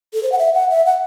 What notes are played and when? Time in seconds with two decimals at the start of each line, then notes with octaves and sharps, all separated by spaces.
0.13 A4
0.23 C5
0.32 F#5
0.39 E5
0.54 F#5
0.70 E5
0.86 F#5